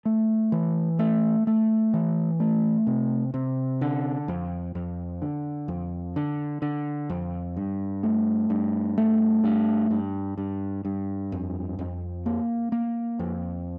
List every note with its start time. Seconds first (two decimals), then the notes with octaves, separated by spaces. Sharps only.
0.05 A3
0.52 E3
0.99 A3
1.47 A3
1.94 E3
2.40 A3
2.87 C3
3.34 C3
3.81 D3
4.28 F2
4.75 F2
5.22 D3
5.68 F2
6.16 D3
6.62 D3
7.10 F2
7.57 G2
8.03 A3
8.50 G2
8.98 A3
9.44 G2
9.91 G2
10.38 G2
10.85 G2
11.32 F2
11.79 F2
12.26 A#3
12.72 A#3
13.19 F2